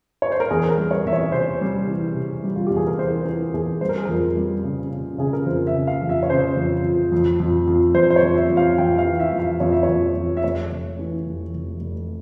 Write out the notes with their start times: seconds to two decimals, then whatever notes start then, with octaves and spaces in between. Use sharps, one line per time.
0.22 C#5
0.32 C5
0.40 A#4
0.51 E2 G#4
0.71 A#4
0.77 G3
0.91 C#5
1.06 E2 E5
1.13 C#5
1.32 C3 C5
1.61 G3
1.87 E3
2.15 C3
2.44 G3
2.56 F4
2.67 E2 G4
2.77 G#4
2.87 A#4
2.99 E3 C5
3.25 E3 A#4
3.54 E2 G#4
3.81 G3 C5
3.89 A#4
3.98 G#4
4.05 F2 A#4
4.37 G3
4.64 C#3
4.92 C#3
5.18 C#3 G#4
5.33 A#4
5.46 F2 C5
5.67 E5
5.75 C#3
5.87 F5
6.02 F2
6.09 E5
6.23 C#5
6.30 C#3 C5
6.57 F2
6.84 F2
7.12 F2
7.40 F2
7.67 F2
7.95 F2 C5
8.10 C5
8.16 C#5
8.22 F2
8.36 E5
8.50 F2
8.57 F5
8.78 F2 G5
8.98 F5
9.05 E3
9.19 E5
9.33 F2
9.39 F5
9.60 F2 C#5
9.72 E5
9.83 C#5
9.89 F2
10.15 F2
10.37 E5
10.43 F1 C#5
10.71 F1
10.99 E3
11.26 F1
11.54 F1
11.81 F1